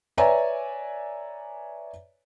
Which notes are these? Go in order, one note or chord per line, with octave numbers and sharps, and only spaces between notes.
B4 C#5 D5 E5 G#5 A#5